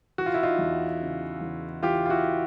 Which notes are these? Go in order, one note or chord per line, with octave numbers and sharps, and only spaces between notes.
E3 F#4
F4
E4
D#4 F4
E2
C#3
E2
E3 F4 G4
F4
E4 F#4